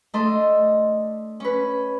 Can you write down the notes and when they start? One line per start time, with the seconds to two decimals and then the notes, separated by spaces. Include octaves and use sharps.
0.14 A3 D4 A4 D#5 C6
1.40 C#4 B4